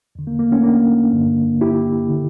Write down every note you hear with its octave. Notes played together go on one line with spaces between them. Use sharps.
E2 D3
A#3
A#3
A3 C#4
A#3 D4
G2 D3
E4 G4
D3